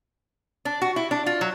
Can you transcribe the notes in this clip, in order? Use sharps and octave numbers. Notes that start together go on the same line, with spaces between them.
D4
F#4
E4
D4
F4
F#3